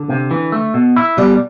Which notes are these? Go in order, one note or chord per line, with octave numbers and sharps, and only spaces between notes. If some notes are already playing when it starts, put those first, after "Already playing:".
Already playing: D3
C3
E3
A3
B2
E4
B2 G3